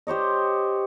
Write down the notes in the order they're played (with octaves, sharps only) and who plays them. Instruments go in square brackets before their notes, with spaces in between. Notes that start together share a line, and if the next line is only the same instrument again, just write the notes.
[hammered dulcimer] G4 C5 C#5 D#5